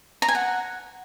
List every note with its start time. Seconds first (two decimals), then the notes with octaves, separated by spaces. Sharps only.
0.22 A#5
0.28 G#5
0.35 F#5